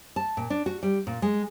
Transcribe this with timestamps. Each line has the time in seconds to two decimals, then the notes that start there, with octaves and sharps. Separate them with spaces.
0.16 A5
0.37 A#2
0.50 D4
0.66 F#4
0.83 G3
1.07 A#2
1.22 G#3